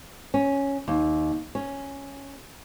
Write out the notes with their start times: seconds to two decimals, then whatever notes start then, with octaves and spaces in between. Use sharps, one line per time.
0.34 C#4
0.88 D#2
1.55 C#4